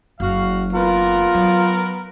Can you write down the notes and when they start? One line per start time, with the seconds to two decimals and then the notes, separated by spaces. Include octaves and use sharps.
0.20 F#1 F#4 F5
0.73 B3 F4 A#4
1.35 F#3